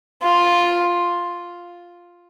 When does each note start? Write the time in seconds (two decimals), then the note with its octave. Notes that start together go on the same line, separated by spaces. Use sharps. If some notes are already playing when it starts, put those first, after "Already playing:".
0.23 F4